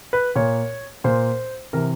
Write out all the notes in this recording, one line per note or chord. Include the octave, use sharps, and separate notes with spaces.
B4
A#2 C#5
A#2 C5
C3 E3 A#4